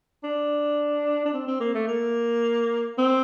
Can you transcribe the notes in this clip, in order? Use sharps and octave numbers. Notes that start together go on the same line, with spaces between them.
D4
D4
C4
C4
A#3
A3
A#3
C4